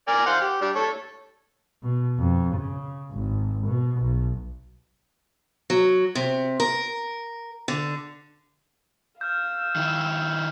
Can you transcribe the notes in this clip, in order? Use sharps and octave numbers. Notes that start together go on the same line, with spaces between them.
A#4 D5 G#5
C5 F5 F#5
G4
G3 D4
A4 C#5
B2
F2
C#3
G#1
B2
B1
F#3
C3
A#4
D3
F5 E6 F6 G6
D#3 E4